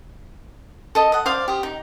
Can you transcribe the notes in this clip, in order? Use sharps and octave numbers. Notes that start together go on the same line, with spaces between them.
A4 D#5
D#5 F#5
C5 D5 F5 D6
G4 D#6
D#4